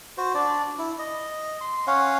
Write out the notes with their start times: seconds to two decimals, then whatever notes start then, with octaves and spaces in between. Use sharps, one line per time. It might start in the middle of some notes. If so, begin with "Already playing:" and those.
0.18 F#4 C5
0.35 D4 D5
0.78 E4
0.99 D#5
1.61 C6
1.87 C#4 C#5 F5 F#5